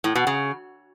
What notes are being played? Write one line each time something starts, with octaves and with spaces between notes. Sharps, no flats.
A2
B2
C#3